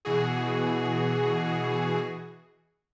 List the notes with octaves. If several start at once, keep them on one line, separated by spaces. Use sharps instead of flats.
B2 E3 F#4 G#4